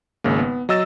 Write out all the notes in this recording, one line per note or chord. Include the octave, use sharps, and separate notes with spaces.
G#1 C#3 A#3
B3
F#3 D#5 E6 A6 E7